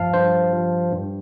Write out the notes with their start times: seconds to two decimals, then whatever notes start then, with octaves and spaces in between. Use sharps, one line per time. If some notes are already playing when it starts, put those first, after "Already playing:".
Already playing: G2 F3 F5 A5
0.14 G2 C5
0.53 F3
0.92 G2